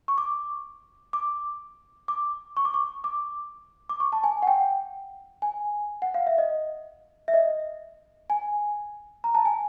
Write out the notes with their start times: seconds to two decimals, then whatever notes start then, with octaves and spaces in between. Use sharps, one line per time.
0.08 C#6
0.18 D6
1.13 D6
2.08 D6
2.57 C#6
2.65 D6
2.74 C#6
3.04 D6
3.89 D6
4.00 C#6
4.12 A5
4.24 G#5
4.43 F#5
4.47 G5
5.42 G#5
6.02 F#5
6.14 F5
6.27 E5
6.38 D#5
7.28 E5
7.34 D#5
8.30 G#5
9.24 A#5
9.35 A5
9.45 G#5